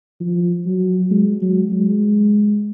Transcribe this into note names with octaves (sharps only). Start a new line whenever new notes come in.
F3
F#3
G#3
F#3
G#3